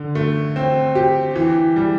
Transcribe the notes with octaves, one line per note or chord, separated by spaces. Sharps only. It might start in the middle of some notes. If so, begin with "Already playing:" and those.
Already playing: D3
A3
C4
G4
E3
G3